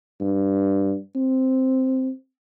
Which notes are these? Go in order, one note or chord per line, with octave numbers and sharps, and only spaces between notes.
G2
C4